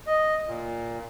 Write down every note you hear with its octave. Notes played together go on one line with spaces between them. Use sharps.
D#5
A#2